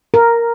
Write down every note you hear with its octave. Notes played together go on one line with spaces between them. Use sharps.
A#4